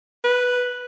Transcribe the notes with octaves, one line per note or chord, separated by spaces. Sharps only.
B4